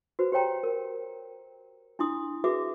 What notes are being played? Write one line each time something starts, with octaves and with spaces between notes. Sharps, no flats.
F#4 B4 C5
G4 C5 C#5 G5 A#5
A#4
D4 E4 C6 D#6
F#4 G#4 B4 E5 D6